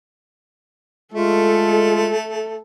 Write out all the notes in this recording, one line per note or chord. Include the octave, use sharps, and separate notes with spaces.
G#3 A3 F4 A4